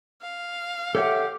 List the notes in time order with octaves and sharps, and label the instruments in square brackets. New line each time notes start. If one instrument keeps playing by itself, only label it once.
[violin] F5
[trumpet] G4 [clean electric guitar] A4 C#5 F#5 [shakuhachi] E5